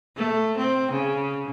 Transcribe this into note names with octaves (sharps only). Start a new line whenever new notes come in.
A3
C4
C#3